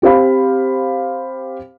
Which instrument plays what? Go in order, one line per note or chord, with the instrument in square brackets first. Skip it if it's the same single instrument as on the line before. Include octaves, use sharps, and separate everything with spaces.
[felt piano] C4 G4 C5 F5 B5